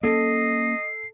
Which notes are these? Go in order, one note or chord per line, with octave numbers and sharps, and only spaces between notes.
A#3 C4 C#4 A4 D#5 C7